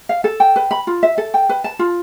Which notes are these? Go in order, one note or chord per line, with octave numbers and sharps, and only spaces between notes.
F5
A4
G5
B4
B5
F4
E5
A4
G5
B4
A5
F4